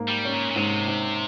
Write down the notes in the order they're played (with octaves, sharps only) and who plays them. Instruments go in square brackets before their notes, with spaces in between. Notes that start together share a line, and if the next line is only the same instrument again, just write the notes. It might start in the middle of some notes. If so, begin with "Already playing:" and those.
Already playing: [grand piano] G#2 A#3
[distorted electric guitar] G3
[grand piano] C#4
[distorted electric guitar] A#2
A#2
[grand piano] G#2 [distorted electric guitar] C3
[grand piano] G#2